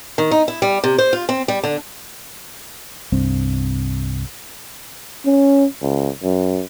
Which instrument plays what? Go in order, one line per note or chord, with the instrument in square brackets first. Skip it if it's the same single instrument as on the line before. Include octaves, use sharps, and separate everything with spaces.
[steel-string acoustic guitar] D#3
D#4
E4
G3
C3
C5
F4
C4
G3
D3
[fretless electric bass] C2 G2 C4
[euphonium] C#4
C#2
F#2